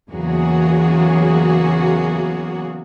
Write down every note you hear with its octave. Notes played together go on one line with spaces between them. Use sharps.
E2 C#3 F#3 A#3 F#4 G#4